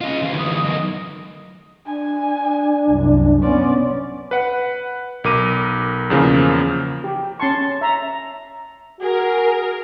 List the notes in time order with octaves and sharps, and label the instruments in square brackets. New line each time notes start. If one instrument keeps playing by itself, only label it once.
[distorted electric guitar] C#4 F4 [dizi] D#5
[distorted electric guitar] D2 E3 [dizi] F5
[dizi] D#6
[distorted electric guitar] F#2 D#3 [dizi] D#5
[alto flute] D4 [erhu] G#5
[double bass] C2 F#2
[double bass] B3 C#4 [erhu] D5 [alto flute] C6
[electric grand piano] B4 F#5
B1 A#4 D6 D#7
E2 C#3 F3 A#3
[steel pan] G4
[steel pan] C#4 C6 C#6 [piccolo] A5
[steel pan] E5 [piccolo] A#5
[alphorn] F#4 [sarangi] G#4 [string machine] A#4